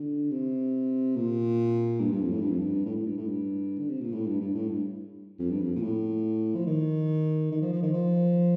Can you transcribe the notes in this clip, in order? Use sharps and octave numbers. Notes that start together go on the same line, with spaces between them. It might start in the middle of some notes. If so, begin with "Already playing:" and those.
Already playing: D3
C3
A#2
G2
G2
F2
A2
G2
F2
G2
A2
A2
G2
A2
G2
D3
C3
A#2
A2
G2
G2
A2
G2
F2
G2
F2
A#2
A2
F3
D#3
D#3
F3
F3
D#3
F3